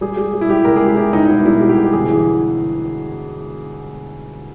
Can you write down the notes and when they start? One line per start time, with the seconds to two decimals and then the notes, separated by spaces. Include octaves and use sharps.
0.01 G3 G#4
0.17 G3
0.34 G3
0.41 E4
0.50 G3 G4
0.65 C#2 A#4
0.76 G#4
0.81 C#2
0.87 G4
0.97 G3 E4
1.13 C#2 D#4
1.25 D#4
1.29 B2 E4
1.45 G3 E4
1.61 G3
1.69 G4
1.77 B2
1.93 G1 G#4
2.09 E3